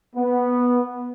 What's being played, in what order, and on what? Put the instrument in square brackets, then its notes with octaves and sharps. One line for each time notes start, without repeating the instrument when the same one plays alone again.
[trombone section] B3